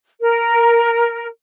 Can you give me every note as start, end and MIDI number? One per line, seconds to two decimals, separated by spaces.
0.20 1.27 70